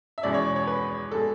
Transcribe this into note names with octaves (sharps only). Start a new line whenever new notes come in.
E5
E2 B2 G#3 C#4 D5
C#5
D5
C#5
B4
B2 G#3 A4